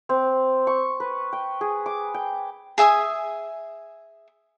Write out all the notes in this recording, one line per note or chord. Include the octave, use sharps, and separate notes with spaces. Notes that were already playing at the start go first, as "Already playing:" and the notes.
C4
C#6
B4
G5
G#4
D6
G5
G#4 E5 G#5 D#6